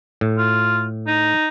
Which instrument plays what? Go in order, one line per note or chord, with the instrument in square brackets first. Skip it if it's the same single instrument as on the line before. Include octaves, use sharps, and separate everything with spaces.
[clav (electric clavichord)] A2
[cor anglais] F4
D#4